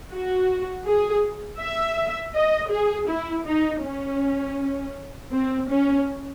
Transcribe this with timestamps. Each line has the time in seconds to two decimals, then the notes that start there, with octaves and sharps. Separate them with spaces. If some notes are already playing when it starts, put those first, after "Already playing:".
0.13 F#4
0.87 G#4
1.61 E5
2.36 D#5
2.73 G#4
3.10 E4
3.48 D#4
3.84 C#4
5.32 C4
5.70 C#4